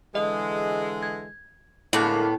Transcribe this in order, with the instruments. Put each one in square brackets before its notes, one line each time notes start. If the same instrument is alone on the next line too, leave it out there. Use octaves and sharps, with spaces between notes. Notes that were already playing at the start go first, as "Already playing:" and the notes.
[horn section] D3 E3 G#3 [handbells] D#5
[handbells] G#6
[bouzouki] A2 B3 [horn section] D3 G#3 A#3 [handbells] E4 F#6